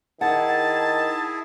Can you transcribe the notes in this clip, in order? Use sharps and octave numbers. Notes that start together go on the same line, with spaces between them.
D#3 E4 G#4 F#5 A5